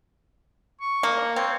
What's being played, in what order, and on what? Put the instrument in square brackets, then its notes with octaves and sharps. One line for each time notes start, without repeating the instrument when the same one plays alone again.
[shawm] C#6
[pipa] A#3
[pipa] C4 [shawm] C#5